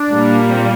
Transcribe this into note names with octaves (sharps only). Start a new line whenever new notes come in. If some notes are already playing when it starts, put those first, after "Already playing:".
Already playing: D4
A#2 G3 A#3
C4